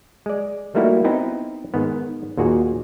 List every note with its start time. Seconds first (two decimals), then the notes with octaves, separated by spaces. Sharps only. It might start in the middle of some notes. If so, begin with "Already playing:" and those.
0.26 G#3 D5
0.75 G3 A3 A#3 D#4 E4 F#4
1.04 B3 C4 D#4 E4 G5
1.74 G#2 D#3 B3
2.37 D#2 A#2 F#4 G#4